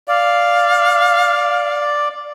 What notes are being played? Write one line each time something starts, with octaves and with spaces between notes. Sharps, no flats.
D5 F5